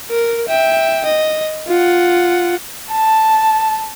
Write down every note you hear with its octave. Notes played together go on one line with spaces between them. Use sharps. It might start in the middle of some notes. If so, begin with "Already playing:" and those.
A#4
E5 G5
D#5
F4 F#5
A5